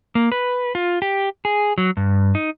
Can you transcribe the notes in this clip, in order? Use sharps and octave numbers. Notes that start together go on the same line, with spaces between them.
A#3
B4
F4
G4
G#4
F#3
G2
D#4